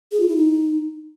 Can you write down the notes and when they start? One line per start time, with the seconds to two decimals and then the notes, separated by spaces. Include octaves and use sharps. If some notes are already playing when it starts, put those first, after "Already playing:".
0.12 G#4
0.20 F4
0.28 E4
0.36 D#4